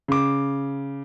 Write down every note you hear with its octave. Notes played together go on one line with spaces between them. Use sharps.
C#3 D6